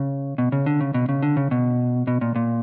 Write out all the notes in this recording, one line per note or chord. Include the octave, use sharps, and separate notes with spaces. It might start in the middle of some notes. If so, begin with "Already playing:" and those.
Already playing: C#3
B2
C#3
D3
C#3
B2
C#3
D3
C#3
B2
B2
A#2
A#2